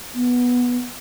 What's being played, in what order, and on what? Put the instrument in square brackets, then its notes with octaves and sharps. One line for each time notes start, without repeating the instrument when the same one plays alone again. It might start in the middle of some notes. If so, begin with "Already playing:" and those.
[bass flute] B3